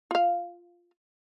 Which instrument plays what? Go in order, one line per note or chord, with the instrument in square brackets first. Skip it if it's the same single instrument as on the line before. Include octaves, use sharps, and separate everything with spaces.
[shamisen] F4 F5